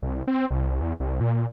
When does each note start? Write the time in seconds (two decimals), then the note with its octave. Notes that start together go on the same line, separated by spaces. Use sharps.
0.02 C2
0.27 C4
0.51 C2
0.81 E2
1.00 C2
1.21 A#2